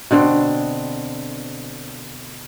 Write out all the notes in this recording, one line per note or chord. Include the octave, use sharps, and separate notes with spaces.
B2 D3 C4